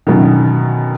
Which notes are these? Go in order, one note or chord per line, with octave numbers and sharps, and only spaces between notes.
F#2 B2 D3 D#3